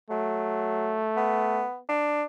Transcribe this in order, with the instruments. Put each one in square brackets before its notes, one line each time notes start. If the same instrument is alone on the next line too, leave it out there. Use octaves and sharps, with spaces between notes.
[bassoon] F#3 [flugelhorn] A3
[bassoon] B3
D4